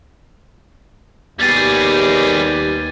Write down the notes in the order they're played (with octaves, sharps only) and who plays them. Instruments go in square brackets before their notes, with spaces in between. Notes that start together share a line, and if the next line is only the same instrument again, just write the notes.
[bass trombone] D#2 [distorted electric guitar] G3 G#4 [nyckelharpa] B3 G4 [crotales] G#6 A6 D#7